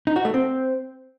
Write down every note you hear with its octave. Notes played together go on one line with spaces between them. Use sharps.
D#4
F#4
A3
C4